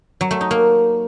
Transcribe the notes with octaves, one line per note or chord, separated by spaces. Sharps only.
F#3
A3
D#4
A#3